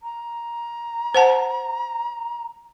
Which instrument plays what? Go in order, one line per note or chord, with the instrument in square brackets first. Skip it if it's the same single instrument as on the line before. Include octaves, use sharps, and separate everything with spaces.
[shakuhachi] A#5
[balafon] C5 F#5 A5